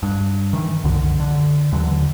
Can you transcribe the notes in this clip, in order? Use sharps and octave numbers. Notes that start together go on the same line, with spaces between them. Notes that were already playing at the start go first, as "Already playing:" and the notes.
G2
D#3 E3
C2 F#2 D3 D#3
D3
D#2 D3 E3 F#3